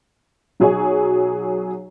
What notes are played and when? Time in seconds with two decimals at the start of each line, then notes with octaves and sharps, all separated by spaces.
0.60 B1 F#3 G#4 C#5 G#5